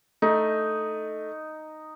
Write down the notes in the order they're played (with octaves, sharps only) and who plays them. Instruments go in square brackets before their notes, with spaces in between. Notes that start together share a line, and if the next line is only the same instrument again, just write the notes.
[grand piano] A3 [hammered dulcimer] D#4